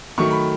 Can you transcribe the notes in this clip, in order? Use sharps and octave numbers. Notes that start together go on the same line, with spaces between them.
D#3 F#3 A3 C#6
B5